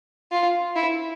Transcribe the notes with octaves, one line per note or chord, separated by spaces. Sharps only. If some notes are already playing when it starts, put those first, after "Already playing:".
F4
E4